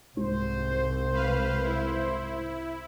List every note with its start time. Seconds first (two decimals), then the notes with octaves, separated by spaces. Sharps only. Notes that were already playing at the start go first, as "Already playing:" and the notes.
0.17 C2 G#2 C5
1.13 B4 F5
1.63 E4